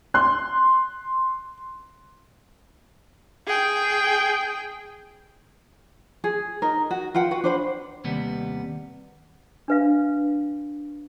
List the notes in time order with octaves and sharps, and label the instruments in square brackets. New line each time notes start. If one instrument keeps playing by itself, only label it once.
[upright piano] C6 F#6
[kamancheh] G#4 G5
[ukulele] G#4
D#4 A#4
F#4
F4 B4 F#5 G5
F#4 B4
D4 C5 B5
[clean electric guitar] D#2 C3 G3 B3
[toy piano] D4 B4 F5